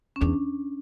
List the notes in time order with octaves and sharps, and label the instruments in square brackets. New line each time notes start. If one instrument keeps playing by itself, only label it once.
[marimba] C#4
[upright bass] E2 [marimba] D4